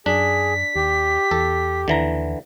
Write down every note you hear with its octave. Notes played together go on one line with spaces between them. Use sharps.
F#2 D4 G#4 B6
D#2 G4
E2 A4
D#2 D3 E3 A#5